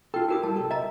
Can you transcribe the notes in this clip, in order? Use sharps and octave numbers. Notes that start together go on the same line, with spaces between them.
F4 A4 G5
E4 F#4 G4 A#4 D#6
G3 A5
C2 A4
D#5 E5 A#5